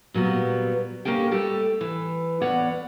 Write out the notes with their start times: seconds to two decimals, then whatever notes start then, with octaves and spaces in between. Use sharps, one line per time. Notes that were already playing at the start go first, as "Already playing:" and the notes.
0.14 A#2 F#3 G3 B3
1.05 D2 G#2 A#3 C#4 G4 G5
1.31 G3 A3 G4
1.81 E3
2.41 E2 B3 C#5 D5 F#5